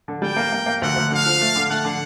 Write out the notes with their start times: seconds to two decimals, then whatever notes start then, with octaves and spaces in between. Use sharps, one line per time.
0.08 D3
0.22 G3 G5
0.37 A#3
0.52 A#3
0.66 A#3
0.81 D2 F#5
0.96 D2
1.11 D3 F5
1.26 F3
1.41 A3
1.56 D3
1.70 A3 F#5
1.85 D3